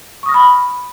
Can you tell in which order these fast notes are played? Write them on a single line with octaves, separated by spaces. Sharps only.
C#6 D#6 A#6 F6 B5